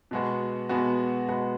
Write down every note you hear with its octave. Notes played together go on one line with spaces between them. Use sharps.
B2 G#3 B3 F#4
B2 G#3 B3 F#4
B2 G#3 B3 F#4